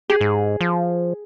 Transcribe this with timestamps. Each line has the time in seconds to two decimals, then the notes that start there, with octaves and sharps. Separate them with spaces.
0.10 G4 G#4
0.21 G#2
0.61 F3